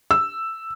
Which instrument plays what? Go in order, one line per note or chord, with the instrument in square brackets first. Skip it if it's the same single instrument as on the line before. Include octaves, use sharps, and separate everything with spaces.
[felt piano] E6